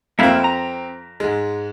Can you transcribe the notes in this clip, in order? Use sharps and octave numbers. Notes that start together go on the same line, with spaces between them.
F2 A#3 C4 E4 A#4 F5 B6
A#5
G#2 G#3